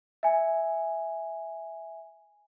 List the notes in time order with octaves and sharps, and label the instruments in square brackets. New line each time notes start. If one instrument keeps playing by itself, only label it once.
[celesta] E5 G#5